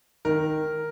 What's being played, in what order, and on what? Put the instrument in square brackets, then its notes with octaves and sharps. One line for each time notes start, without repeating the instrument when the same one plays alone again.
[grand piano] D#3 A#4